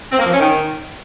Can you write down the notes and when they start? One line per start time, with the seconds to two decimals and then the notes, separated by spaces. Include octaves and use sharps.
0.12 C4
0.19 A#3
0.26 F3
0.33 C#4
0.40 D#3